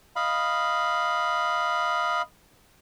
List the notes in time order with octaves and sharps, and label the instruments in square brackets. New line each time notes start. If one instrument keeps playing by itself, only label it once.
[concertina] D#5 F5 B5